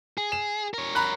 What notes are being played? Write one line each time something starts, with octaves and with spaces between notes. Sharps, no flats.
G#4
E7
A#4 C#5
A#5 B5 F#6